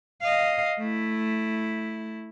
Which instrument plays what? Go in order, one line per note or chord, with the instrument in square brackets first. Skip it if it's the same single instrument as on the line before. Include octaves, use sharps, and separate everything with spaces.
[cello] D#5 F5
A3 E4